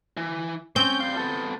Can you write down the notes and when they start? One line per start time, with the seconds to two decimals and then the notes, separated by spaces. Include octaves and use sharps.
0.17 E3
0.76 C4 C#4 G6
1.00 G3 F5
1.17 B3 A4